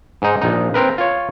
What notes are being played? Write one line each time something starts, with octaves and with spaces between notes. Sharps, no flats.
G#2 D#4
A#1 D#4
C4 A#4 B4
F4 C#5